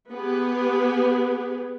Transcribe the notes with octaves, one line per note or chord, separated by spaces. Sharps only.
B3 G4 G#4 B4